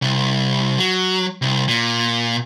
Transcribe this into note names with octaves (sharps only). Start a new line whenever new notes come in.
C2
F#3
C2
A#2